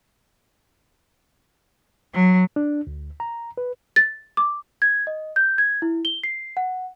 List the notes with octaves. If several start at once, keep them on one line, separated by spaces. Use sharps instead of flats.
F#3
D4
D2
A#5
B4
A6
D6
G#6
D#5
G6
G#6
E4
G7
C7
F#5